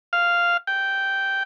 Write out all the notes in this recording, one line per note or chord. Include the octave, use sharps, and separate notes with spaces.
F5
G5